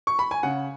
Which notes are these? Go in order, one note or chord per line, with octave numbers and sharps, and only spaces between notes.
C#6
B5
G#5
C#3 F#5